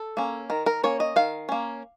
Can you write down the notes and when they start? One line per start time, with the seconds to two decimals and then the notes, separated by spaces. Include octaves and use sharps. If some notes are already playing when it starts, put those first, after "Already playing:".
Already playing: A4
0.17 A#3 C#4
0.50 D#3 A#4
0.66 A#4
0.83 A#3 C#4 C#5
1.00 D#5
1.16 D#3 F5
1.49 A#3 C#4